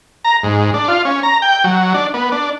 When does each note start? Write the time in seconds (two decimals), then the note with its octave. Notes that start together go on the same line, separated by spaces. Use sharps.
0.25 A#5
0.43 G#2
0.74 D4
0.88 F4
1.05 C#4
1.23 A#5
1.42 G5
1.64 F#3
1.94 D4
2.14 B3
2.32 D4